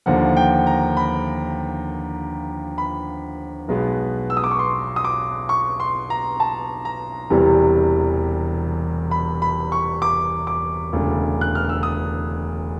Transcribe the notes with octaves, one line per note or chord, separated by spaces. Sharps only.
D#2 D3 F3 A#3 F#5
F#5
G5
A#5
B5
B5
B1 B2 G#3 B3
E6
D#6
D6
C#6
C6
D#6
D6
C#6
C6
A#5
A5
A#5
E1 E2 C3 E3 G3
B5
B5
C#6
D6
D6
E1 D2 C#3
F#6
F6
E6
D#6